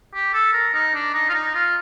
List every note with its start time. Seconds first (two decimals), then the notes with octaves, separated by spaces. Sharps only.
0.14 G4
0.34 A4
0.53 A#4
0.74 D#4
0.95 D4
1.14 D#4
1.29 F4
1.34 D#4
1.55 F4